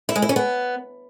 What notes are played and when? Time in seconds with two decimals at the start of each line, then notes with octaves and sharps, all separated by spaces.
0.09 E4
0.16 G#3
0.22 E4
0.29 C#4
0.36 B3